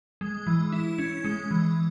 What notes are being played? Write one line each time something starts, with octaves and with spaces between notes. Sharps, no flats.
G#3
E3
E4
C#4
G#3
E3